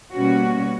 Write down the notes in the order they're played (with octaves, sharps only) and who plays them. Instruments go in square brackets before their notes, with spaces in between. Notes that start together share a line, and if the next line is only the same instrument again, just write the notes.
[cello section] B2 G3 A#3 C#4 F#4